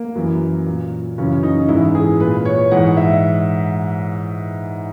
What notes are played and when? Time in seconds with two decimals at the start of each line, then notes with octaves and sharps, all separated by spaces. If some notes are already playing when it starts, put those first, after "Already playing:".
Already playing: A#3
0.15 F#2 E3
0.66 A#2
1.18 F#2 C#3 E3 C#4
1.43 D#4
1.69 G#2 E3 E4
1.95 G#4
2.20 A#2 B4
2.45 C#5
2.71 G#2 E3 F#5
2.97 E5